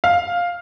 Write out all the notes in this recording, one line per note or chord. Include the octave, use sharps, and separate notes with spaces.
F5